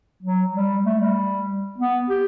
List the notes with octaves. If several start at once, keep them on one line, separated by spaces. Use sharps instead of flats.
F#3
G3
A3
G3
B3
G4